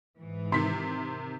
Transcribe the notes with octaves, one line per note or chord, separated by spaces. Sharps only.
G#2 E3
C3 D#3 C6 B6